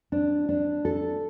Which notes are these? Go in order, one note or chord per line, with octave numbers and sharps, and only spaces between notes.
D4
D4
A4